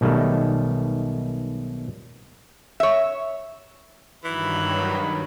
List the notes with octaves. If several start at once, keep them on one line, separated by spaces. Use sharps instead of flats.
B1 B2 D#3 G3 A3
C#5 E5
G2 D#3 E3 F#3 B5